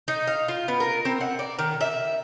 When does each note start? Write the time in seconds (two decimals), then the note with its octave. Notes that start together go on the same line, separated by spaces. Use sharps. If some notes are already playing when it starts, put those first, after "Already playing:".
0.08 D#4
0.27 F5
0.48 F4
0.68 B3
0.80 A#4
1.05 C4
1.21 F#5
1.39 D5
1.59 D#3
1.81 E5